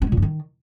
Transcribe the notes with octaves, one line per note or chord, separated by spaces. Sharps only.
C4
G#3
A#2
G2
D#3